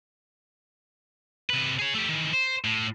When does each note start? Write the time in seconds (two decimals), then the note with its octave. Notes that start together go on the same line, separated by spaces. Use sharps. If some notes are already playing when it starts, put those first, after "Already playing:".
1.50 C3 B4
1.79 G#4 C#5
1.94 A3 G4
2.09 D#3 E3
2.33 C5
2.64 A2